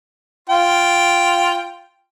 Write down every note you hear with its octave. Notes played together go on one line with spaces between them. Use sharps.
F4 G5